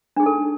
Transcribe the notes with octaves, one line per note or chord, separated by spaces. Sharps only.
D4 D#4 G#4 A4